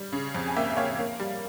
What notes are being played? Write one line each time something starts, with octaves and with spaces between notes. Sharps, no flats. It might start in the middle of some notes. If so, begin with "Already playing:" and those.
Already playing: G3
C#3
F2
G#5
A#3 E5 G5
E5
A#3 C#5 F5
A#3
G3